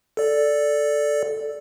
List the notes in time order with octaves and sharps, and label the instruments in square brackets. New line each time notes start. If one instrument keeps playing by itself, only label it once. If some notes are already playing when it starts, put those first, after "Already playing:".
[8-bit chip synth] A4 D5